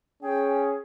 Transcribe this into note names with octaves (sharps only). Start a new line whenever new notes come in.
C#4 G#4 G5